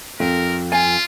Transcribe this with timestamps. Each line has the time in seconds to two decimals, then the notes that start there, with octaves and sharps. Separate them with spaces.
0.20 F2 A#4
0.72 F4 G#5